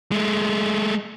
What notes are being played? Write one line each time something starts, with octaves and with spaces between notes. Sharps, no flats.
G#3 A3